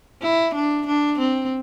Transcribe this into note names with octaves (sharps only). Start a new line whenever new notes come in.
E4
D4
D4
C4